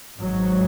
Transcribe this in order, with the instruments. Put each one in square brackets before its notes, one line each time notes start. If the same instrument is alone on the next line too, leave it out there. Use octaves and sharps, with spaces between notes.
[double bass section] G#1 G#2 F#3